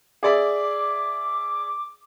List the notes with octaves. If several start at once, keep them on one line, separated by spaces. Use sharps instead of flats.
G#4 D5 E5 D6